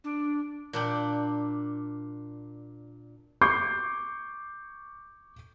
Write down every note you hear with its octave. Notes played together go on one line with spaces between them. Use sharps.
D4
A#2 D4 G5
C#6 D6 G6 C7